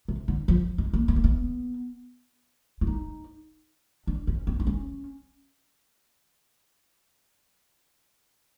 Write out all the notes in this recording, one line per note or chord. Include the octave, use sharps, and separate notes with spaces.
C3
D3
F3
G#3
A#3
B3
A#3
B3
E4
D#4
D4
C#4
C4
D4
C#4